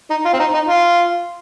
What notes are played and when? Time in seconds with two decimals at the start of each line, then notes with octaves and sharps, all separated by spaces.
0.10 D#4
0.25 F4
0.33 C4
0.40 D#4
0.54 D#4
0.68 F4